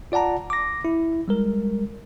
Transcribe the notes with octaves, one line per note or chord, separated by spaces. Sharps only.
F4 D5 F#5 A5 A#5
D6 A#6
E4
G3 G#3 A#4